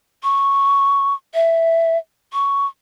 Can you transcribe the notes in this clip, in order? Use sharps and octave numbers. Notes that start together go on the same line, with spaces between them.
C#6
E5
C#6